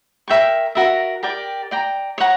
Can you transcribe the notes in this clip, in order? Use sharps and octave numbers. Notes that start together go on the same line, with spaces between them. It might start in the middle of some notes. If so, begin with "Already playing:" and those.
A#4 E5 G5 C#6
F#4 A#4 E5
G4 A#4 D5 G5
D5 G5 A#5
C#5 F#5 A#5